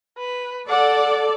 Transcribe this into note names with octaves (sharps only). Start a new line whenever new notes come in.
B4
A4 D5 F#5